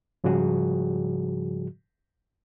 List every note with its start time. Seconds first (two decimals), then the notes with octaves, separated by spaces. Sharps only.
0.24 G#2 C#3 F3 G3 F#4 G#4